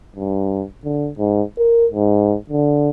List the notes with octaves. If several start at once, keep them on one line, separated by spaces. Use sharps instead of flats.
G2
D3
G#2
A#4
G#2
D3